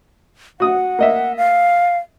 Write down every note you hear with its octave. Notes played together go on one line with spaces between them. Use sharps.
F#4 F#5 D#6
A#3 D#5 E5
F5